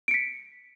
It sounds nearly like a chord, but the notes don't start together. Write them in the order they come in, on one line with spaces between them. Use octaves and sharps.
D7 C#7 B6